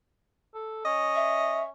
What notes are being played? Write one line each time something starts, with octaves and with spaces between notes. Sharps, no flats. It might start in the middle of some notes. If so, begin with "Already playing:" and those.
A4
C#4 D#5
E5